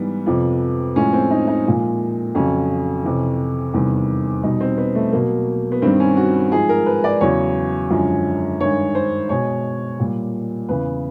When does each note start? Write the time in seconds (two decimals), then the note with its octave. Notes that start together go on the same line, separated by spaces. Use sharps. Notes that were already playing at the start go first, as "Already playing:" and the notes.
Already playing: G#2 E3 G3 B3
0.26 F2 C3 F3
0.96 A2 F3 G#3 C#4
1.13 C4
1.30 D#4
1.47 D#4
1.66 A#2 F3 G#3
2.35 F2 C#3 F#3 C#4
3.04 F2 C3 E3
3.74 E2 C3 D#3 G3
4.43 B2 G3 D#4
4.61 C4
4.78 B3
4.95 A3
5.12 B2 F#3 A#3
5.72 B3
5.82 G2 D#3 G3 C4
6.00 C#4
6.17 F#4
6.52 G#2 F3 G#3 G#4
6.69 A#4
6.86 B4
7.04 D5
7.21 E2 C#3 F#3 C#5
7.90 F#2 D3 F3 G#3
8.60 G2 D#3 G#3 C#5
8.95 C5
9.29 B2 G#3 C#5
10.00 A#2 G3
10.69 E2 C#3 E3 B4